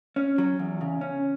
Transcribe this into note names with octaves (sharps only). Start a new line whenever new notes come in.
C#4
F#3
E2
C#3
C#4